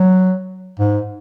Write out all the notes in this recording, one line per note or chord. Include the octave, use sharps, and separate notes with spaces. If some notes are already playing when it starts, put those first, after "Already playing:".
Already playing: F#3
G#2